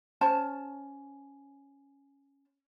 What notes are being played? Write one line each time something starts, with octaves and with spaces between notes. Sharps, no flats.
C#4 C5 A5